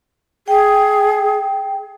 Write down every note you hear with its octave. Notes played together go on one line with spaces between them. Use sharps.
G#4 G5